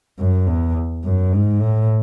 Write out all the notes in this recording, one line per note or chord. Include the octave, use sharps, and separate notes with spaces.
F#2
E2
F#2
G#2
A2